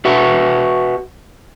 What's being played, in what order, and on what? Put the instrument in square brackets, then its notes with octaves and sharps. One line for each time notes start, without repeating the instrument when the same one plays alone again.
[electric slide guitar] F#4 B4 E5 F#5